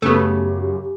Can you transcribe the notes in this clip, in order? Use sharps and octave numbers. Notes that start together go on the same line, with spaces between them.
F#2 C#3 A3 B3 G4